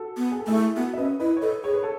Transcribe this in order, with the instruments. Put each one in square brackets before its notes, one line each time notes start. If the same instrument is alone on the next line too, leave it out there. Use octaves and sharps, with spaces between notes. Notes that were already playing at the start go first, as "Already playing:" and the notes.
Already playing: [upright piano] F#4 A4
[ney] B3
[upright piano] G#4
A4
[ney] A3 [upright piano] E4 G#4
[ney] B3 [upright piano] F#4 A4
[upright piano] E5
[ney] C#4 [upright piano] B4 D#5
[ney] E4 [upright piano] B4 D#5
[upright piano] C#5
[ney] A4 [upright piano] B4 D#5
[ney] G#4 [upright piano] C#5
[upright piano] B4
A4 C#5